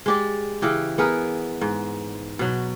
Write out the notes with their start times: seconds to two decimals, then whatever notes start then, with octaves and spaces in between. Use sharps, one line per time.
0.06 G#3 G4 D5
0.62 C#3 E3 G4
0.98 B3 G#4 A#4 B4
1.61 G#2
2.39 B2 F#3